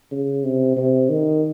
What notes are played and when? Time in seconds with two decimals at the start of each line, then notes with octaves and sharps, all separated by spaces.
0.12 C#3
0.44 C3
0.77 C3
1.09 D#3